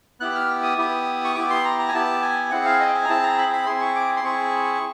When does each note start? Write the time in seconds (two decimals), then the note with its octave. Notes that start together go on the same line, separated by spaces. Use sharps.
0.20 B3 E4 G4 F#6
0.35 F6
0.63 D#6
0.78 B3 E4 G4
1.25 C#6
1.35 B3 E4 G4 D6
1.50 C6
1.65 A#5
1.79 A#5
1.88 G#5
1.93 B3 E4 G4 A5
2.22 G#5
2.51 C4 E4 G#4 F#5
2.65 F5
2.80 D#5
2.88 G5
2.94 G#5
3.05 A#5
3.09 C4 E4 G#4 A5
3.23 A#5
3.38 B5
3.53 B5
3.66 C4 E4 G#4 C6
3.81 C#6
3.96 D6
4.17 C6
4.24 C4 E4 G#4 C#6